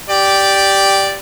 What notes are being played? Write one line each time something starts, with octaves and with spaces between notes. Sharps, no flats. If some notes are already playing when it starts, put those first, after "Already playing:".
G4 D5